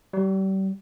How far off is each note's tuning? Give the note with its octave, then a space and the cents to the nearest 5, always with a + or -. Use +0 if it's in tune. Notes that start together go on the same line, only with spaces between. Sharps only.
G3 -35